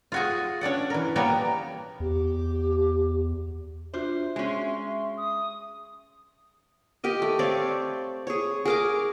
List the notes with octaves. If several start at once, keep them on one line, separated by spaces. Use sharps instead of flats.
F4 F#4 G#4
C#4 D4 D5 F#5
E3 A#4
F3 G3 A#3 B3 C#5 A#5
E2 G4
D4 F4 F#4 C5 E5
G#3 C#4 F#4 C6
D#6
G4 A#4 D#5
A3
C4 C#5 D5 F5
G#4 C#5
G#4 A#4 D6